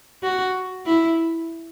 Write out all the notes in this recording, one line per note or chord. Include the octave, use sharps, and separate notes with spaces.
F#4
E4